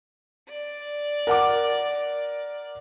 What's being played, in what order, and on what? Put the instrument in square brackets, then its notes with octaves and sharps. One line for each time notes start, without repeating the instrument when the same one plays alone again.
[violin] D5
[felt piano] A#4 F#5 D6